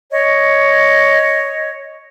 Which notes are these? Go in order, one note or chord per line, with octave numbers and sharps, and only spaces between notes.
C#5 D#5